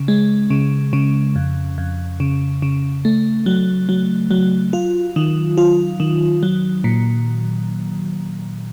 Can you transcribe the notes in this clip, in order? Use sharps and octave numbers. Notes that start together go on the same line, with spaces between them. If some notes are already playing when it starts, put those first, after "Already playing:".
Already playing: C#3
G#3
C#3
C#3
F2
F2
C#3
C#3
A3
F#3
F#3
F#3
F4
D#3
F4
D#3
F#3
A#2